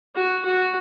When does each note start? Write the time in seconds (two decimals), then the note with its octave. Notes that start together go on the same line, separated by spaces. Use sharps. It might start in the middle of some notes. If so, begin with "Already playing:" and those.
0.15 F#4
0.45 F#4